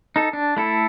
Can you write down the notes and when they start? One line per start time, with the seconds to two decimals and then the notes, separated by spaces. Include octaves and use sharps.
0.16 D#4 A4
0.33 D4
0.57 A3 E4 A4